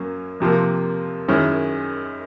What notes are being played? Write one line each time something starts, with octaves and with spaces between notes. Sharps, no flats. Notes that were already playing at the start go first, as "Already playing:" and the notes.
Already playing: F#2 F#3 A#3 C#4
F2 C3 F3 A#3
F#2 D#3 G#3 C#4 E4